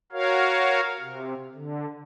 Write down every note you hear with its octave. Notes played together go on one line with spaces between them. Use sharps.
F#4 A#4 C#5 F5
C3
D3